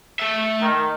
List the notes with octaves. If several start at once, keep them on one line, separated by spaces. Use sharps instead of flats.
A3 E5
D#3